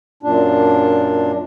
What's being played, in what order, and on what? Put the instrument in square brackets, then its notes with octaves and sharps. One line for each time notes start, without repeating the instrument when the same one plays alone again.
[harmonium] F#2 A#2 D4